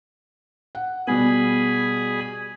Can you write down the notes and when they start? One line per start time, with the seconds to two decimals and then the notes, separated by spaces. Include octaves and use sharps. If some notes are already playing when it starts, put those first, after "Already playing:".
0.75 F#5
1.07 B2 G3 B3 G#4 G#5 B5